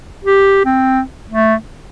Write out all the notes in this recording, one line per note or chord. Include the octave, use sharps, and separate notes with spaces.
G4
C4
A3